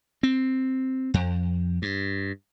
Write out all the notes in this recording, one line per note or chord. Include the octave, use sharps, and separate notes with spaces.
C4
F2
G2